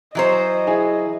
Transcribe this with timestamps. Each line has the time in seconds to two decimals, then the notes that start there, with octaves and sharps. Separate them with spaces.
0.15 E3 F#3 C5 D#5
0.67 E4 G#4